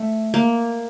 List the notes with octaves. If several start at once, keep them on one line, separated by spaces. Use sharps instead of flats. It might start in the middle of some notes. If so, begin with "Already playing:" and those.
Already playing: A3
A#3